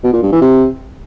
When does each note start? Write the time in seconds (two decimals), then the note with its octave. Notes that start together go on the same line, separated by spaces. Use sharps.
0.04 B2
0.13 A#2
0.23 G2
0.32 E3
0.41 C3